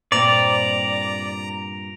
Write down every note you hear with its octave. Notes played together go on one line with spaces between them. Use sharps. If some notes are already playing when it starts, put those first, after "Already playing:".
G2 A#2 C4 D5 A#5 A#6 D7 F7